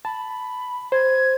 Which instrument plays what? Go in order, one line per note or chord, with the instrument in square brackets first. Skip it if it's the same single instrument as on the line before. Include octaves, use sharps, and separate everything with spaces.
[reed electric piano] A5 [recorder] B5
[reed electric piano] C5 [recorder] G#6